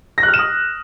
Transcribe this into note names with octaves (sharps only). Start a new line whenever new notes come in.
A#6
F#6
F6
E7
D#6